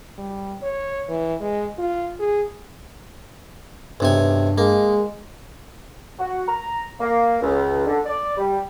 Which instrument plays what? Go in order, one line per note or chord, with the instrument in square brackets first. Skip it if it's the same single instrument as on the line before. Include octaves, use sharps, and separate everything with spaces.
[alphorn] G3
C#5
E3
G#3
F4
G#4
[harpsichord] B1 C3 G#5 [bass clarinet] G2
[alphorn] G#3 [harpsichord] A#3
[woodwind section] F#4
A#5
A#3
C#2
D3
D5
G3